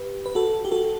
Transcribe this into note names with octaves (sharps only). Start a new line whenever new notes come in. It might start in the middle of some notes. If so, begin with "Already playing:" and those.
Already playing: G4 B4
B4
F#4 A4
G4
F#4 A4